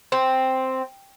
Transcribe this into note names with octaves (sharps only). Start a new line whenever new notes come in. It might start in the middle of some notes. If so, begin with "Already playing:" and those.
C4